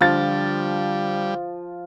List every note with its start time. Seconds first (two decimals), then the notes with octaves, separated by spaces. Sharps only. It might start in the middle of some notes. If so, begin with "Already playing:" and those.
0.01 D3 F3 G3 F6 A6